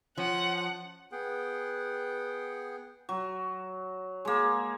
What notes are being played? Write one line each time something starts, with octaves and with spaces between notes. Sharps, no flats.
F3 C#4 F#5
B3 G#4 F#5 G5
F#3
G#3 A#3